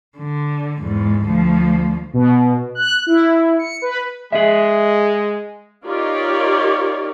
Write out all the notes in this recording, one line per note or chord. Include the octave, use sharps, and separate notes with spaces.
D3
E2 G#2
D2 F3
B2
F#6
E4
C#7
B4
G#3 G#4 D#5 E5
D#4 F4 G4 A#4 C#5 D5